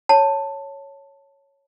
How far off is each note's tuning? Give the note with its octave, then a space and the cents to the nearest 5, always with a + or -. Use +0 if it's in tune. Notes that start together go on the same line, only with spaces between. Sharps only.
C#5 +0 A5 +10